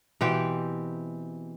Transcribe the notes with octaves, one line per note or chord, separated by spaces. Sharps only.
B2 E3 C4 G4